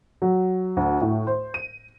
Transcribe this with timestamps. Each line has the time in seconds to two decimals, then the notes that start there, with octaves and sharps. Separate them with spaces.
0.22 F#3
0.77 D2
1.01 A2
1.27 C5
1.54 D#7